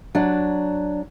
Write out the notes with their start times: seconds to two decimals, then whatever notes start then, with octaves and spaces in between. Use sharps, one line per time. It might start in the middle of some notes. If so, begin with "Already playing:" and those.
0.15 F#3 D4